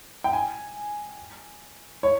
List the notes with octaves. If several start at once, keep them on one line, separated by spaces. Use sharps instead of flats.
G5
G#5
C#5